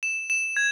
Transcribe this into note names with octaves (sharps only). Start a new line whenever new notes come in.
E7
E7
G#6